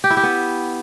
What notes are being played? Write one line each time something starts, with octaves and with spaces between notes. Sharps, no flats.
G4
E4
G4
B3